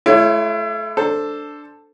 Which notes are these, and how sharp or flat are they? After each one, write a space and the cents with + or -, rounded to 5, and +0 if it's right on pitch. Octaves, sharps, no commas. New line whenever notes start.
A3 -30 E4 +35 C#5 +0
D4 +0 A4 +10 C5 +0